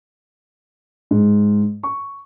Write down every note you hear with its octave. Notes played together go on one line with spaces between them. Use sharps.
G#2
C#6